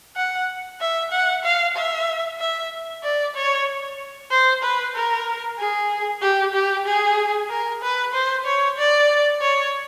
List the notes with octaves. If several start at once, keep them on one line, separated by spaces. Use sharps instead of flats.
F#5
E5
F#5
F5
E5
E5
D5
C#5
C5
B4
A#4
G#4
G4
G4
G#4
A#4
B4
C5
C#5
D5
C#5